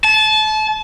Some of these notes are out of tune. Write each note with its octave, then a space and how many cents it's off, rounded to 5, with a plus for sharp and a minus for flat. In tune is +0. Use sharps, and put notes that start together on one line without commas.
A5 -30